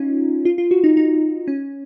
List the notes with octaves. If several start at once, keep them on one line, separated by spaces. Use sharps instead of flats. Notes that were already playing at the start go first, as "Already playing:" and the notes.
Already playing: C#4 D#4 F4
F4
F4
F#4
D#4
D#4
C#4